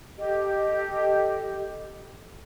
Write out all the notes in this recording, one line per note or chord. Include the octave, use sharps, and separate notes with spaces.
G4 A4 D#5